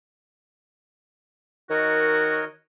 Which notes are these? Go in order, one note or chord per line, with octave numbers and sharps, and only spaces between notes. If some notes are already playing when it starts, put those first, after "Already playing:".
D#3 F#4 A#4 C#5 D#5